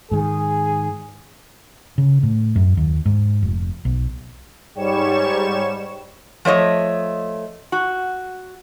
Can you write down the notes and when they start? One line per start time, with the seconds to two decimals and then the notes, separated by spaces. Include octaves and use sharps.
0.11 G#2 D#3 G#4
1.98 C#3
2.23 A2
2.56 F#2
2.77 D#2
3.06 G#2
3.42 F1
3.85 B1
4.75 G#2 G3 C#5 C#6 E7
6.45 F3 A3 C#5 D#5
7.72 F#4